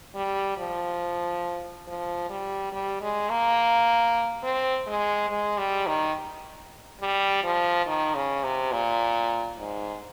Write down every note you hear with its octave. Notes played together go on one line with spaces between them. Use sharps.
G3
F3
F3
G3
G3
G#3
A#3
C4
G#3
G#3
G3
D#3
G3
F3
D#3
C#3
C3
A#2
G#2